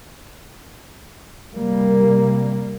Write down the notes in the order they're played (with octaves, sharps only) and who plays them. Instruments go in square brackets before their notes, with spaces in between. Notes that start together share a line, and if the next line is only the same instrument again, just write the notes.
[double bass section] C3 G3 A#3